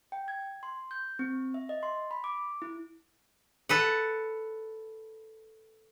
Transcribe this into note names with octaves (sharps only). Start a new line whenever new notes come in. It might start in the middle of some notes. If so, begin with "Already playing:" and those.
G5
G#6
C6
G6
C4
E5
D#5
C6
B5
D6
E4
A4 B4 F#5